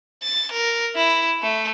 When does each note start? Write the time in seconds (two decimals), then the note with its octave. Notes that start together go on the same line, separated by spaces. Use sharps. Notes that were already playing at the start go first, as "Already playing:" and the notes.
0.23 A6
0.52 A#4
0.96 E4
1.42 A3